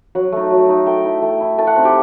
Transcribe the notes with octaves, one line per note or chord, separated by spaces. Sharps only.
F#3 F#5
A3 D#4
F#3
A3 D#4
A3 G5
E4
A3
E4
A3 A5
F#5
C4 D#4
G4